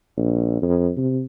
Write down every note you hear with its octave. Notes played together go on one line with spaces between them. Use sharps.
A#1
F2
C3